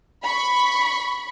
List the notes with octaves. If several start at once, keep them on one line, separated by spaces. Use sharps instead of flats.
B5 C#6